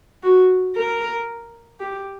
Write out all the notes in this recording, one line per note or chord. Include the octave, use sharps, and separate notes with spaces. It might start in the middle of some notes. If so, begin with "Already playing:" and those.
F#4
A#4
G4